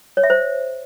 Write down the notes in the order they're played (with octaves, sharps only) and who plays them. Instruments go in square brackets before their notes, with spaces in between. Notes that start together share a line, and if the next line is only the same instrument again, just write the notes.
[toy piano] C#5
E5
C5